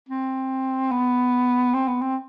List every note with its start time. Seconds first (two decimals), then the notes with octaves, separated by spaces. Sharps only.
0.09 C4
0.91 B3
1.74 C4
1.88 B3
2.01 C4